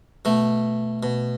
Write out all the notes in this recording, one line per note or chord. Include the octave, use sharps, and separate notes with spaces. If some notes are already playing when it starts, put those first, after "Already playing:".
B2 A3
B2